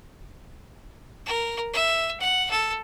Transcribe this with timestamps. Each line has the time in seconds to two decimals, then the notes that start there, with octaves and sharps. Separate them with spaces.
1.26 A#4
1.73 E5
2.20 F#5
2.50 A4